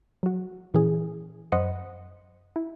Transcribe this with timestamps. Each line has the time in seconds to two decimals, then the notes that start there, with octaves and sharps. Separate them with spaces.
0.23 F#3 F#4
0.74 A#2 E3 C#4 G#4
1.52 F#2 C5 D#5 F#5 B5 C#7
2.56 E4